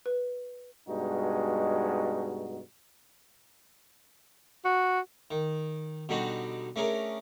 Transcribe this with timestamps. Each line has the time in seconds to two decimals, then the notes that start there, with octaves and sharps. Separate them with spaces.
0.06 B4
0.88 G2 B2 G#3 D#4 F#4
4.65 F#4
5.31 D#3
6.09 B2 D3 G3 D4 D#4 F#4
6.76 A3 C#4 D4 G#4 A#4